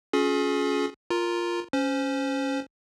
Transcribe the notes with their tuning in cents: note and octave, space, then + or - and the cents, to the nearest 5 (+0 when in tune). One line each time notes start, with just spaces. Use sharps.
C#4 +10 F4 +45 G#4 +35
F4 +0 A#4 +0 A#5 +0
C#4 +0 C5 -15